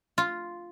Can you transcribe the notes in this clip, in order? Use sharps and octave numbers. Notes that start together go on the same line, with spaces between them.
F4